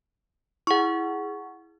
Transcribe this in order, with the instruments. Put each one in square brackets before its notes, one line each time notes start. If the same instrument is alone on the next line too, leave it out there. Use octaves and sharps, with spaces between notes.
[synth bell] E4 G#4 [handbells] F#5 C#6